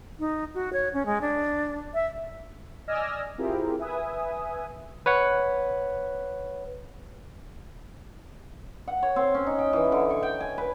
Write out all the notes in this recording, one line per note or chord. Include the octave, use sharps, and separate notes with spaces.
D#4
F#4
C#5
C#4
G#3
D4
E5
D5 D#5 G#5 E6 F6 A#6
C4 E4 F4 G4 G#4 A#4
B4 E5 G#5 D#6
B4 C#5 F#5
F#5
C#5
C4
C#4
D#4
G5
E3
D3
C#6
G5
G#5
B4